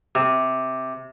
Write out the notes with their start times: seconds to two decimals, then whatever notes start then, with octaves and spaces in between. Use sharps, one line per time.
0.15 C3